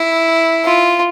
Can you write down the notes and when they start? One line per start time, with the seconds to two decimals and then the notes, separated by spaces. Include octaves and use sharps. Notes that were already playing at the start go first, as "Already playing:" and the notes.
Already playing: E4
0.65 F4